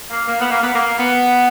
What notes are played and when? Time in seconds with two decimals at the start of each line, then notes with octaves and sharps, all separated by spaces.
0.10 A#3
0.27 A#3
0.39 B3
0.50 A#3
0.62 B3
0.74 A#3
0.98 B3